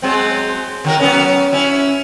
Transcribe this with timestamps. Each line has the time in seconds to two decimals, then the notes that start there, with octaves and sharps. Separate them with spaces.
0.02 F#3 G#3 C4
0.84 D#3 F#3 A#4
1.00 F#3 B3 C#4
1.53 C#4 E4